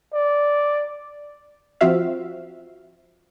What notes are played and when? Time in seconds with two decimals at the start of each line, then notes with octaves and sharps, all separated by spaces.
0.13 D5
1.81 F3 C4 F4 F#4 E5 F5